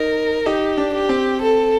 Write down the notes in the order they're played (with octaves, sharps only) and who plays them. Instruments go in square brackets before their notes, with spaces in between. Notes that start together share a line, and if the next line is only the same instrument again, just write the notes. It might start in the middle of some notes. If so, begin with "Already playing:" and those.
Already playing: [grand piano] D#4 [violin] A#4
[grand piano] D#4 [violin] G4
[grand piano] D4
[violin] G4
[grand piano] C4
[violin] A4